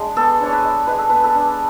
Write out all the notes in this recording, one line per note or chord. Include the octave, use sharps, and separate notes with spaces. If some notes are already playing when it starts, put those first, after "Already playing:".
Already playing: G#3 D4
B3 A4
D4 C#5
B4
G#3
G#3 B4
A4
B3 B4
A4
D4